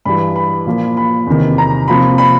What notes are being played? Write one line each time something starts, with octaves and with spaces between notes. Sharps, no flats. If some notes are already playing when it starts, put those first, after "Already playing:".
G2 E3 G3 B5
B5
A#2 F3 A#3
B5
E2 C3 D#3
A#5
C3 F3 A#3 B5
B5